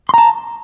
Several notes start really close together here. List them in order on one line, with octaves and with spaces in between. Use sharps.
C6 A#5 A5